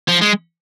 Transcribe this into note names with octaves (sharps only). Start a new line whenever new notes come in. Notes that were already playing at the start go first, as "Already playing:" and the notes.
F3
G#3